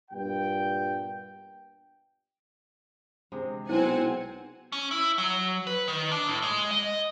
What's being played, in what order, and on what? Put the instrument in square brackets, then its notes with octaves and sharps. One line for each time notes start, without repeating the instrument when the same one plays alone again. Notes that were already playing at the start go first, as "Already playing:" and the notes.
[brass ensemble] G2 A#2 B3 G5
[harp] C3 G#3
[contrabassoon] B1 [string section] C4 F#5 G#5 [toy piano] E4 C5
[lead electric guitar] C#4
E4
F#3
B4
D#3
D4
A2
G#3
D#5